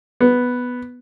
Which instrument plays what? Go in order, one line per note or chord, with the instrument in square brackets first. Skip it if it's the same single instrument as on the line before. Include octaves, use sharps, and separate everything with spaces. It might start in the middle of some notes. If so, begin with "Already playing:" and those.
[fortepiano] B3